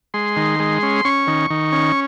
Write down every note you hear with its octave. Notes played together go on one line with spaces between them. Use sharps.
G#3 C6
D#3
G#3
C#4
C#4 C#6
D#3
D#3
C#4